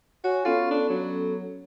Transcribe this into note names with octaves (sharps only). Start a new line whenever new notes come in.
F#4 C#5 G#5
B3 C#4 F4 A4
D4
F#3